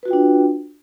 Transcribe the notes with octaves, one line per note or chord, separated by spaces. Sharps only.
D4 F4 F#4 B4 G5